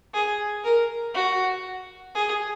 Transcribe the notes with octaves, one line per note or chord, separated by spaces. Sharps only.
G#4
A#4
F#4
G#4